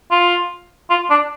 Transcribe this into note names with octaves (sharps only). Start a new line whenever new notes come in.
F4
F4
D4